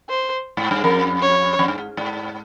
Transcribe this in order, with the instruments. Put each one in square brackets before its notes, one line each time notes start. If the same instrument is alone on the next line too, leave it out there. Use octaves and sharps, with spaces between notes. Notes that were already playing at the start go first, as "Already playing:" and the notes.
[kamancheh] C5
[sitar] G#2
G2
[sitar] F2 [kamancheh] A#4
[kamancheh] C#5
[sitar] F2
G2
G#2
G#2